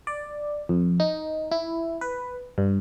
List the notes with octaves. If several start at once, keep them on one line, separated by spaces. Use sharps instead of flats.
D5
F2
D#4
E4
B4
G2